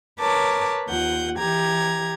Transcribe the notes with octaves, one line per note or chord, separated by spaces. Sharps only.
A#4 B4 C#5 A5 D6
D#2 F4 F#5 G6
E3 G4 A#5 G#6